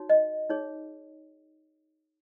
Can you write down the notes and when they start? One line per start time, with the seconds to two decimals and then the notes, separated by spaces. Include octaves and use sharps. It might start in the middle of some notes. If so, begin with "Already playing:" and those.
Already playing: D#4 F#4 C#5
0.10 D#5
0.50 D#4 G#4 C#5